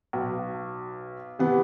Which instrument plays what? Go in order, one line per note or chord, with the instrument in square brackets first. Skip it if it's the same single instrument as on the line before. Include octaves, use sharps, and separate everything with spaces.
[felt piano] B1
[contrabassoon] C3 [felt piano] E3 B3